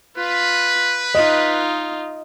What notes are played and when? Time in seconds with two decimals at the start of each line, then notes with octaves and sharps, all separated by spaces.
0.16 F4 B4
1.15 D#4 F4 D#5